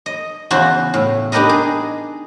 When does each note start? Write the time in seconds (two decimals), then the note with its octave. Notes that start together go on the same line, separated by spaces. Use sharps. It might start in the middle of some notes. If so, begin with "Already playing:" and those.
0.06 D#5
0.51 E2 C#3 F#4 C5
0.94 A2
1.32 D4 D#4 G4 A#4 B4 D#5
1.49 G#4